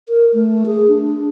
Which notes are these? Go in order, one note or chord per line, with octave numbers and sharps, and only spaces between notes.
A#4
A3
G#4
D4